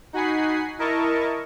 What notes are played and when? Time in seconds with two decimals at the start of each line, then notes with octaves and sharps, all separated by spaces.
0.13 D#4 F#4 F#5 G#5 B5 C7
0.78 E4 A#4 D#5 A5 C#6